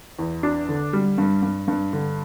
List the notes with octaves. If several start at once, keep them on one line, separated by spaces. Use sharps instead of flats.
E2
D4
D3
G3
G2
G2
G2
D3